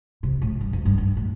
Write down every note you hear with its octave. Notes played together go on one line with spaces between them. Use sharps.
C3
A2
G2
F2
G2
G2
A2